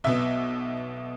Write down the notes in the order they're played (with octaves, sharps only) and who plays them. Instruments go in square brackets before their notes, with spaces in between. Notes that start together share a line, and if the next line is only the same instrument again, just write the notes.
[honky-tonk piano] B1 B2 B3 E5